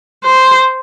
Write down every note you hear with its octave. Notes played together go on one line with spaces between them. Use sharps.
C5